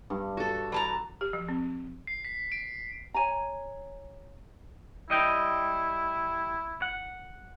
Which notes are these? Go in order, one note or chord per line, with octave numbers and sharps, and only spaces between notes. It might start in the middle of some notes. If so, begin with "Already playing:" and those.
G2
F#4 A4
E3 A5 A#5
G4
F3
C4
C7
B6
D7
C#5 G#5 A#5
G3 E4 D#5 G5
F#5